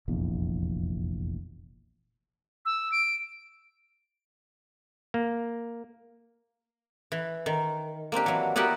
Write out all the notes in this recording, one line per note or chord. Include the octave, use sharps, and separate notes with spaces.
F1 A#1 E2
E6
D7
A#3
E3
D#3
A#3 C4 D4 G4
E3 F#3
B3 E4 F#4 G4 A#4